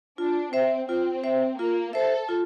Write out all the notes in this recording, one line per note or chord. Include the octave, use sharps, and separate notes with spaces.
D4 F4
C4 C5 E5
C4 F4
C5 E5
A#3 F4
A4 C5 E5
F4